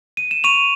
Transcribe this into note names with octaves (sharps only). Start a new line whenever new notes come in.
D#7
E7
C#6 D#7 F7